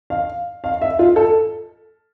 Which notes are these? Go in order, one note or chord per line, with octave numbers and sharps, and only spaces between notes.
F5
F5
E5
F4
A4